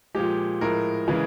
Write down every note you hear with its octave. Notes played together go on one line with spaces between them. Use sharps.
A#2 F3 G#3 G4
A2 F3 G#3 A#4
C#3 E3 G#3